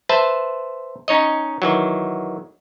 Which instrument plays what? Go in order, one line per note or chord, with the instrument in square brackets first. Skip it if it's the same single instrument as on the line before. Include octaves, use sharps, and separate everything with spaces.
[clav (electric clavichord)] B4 C5 E5 A5
C#4 D#4 C#5 D#5
D#3 E3 F#3